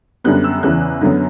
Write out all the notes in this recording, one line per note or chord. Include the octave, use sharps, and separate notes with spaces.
F#2 D3 G3 B3 F#6
E6
E2 C#3 E3 F#6
F#2 D3 F#3 B3